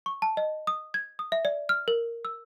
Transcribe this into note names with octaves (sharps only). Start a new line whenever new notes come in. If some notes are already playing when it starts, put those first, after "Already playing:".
C#6
A5
D#5
D#6
G#6
D#6
E5
D5
F6
A#4
E6